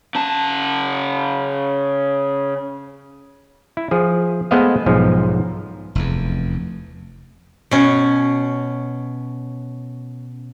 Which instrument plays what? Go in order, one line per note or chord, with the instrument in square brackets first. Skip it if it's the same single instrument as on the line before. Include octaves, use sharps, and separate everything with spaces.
[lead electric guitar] C#3 A5
[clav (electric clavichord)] E4
F3 G#4
G#3 A3 B3 C5 D#5 F5
B1 G#2 F3 D#4
[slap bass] F1 E2
[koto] B2 C#4